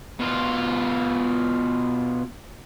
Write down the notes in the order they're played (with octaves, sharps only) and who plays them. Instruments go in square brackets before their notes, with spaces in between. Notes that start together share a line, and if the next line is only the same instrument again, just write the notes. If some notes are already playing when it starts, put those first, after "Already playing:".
[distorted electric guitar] B2 F4